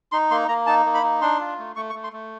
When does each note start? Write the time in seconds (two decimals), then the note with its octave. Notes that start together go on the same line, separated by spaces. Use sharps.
0.12 D#4 C6
0.31 A#3 C6
0.48 A#3 A#5
0.66 D#4 A5
0.86 A#3
0.94 B5
1.03 D#4
1.22 D4 C6
1.40 F4
1.58 A3
1.76 A3 C#6
1.90 C#6
1.95 A3
2.04 C6
2.13 A3